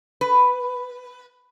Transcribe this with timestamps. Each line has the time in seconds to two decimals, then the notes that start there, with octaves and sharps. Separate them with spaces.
0.21 B4